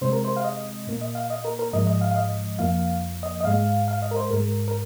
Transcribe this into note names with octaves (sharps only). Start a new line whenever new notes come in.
C3 G#3 C5
A#4
C5
F5
D#5
A#2 A#3
D#5
F5
D#5
A#4
A#4
G#2 F3 G#3 D#5
D#5
F5
F5
D#5
F2 F3 A#3 F5
D#5
D#5
G#2 G#3 F5
F5
D#5
A#4
C5
G#2 G#3 A#4
A#4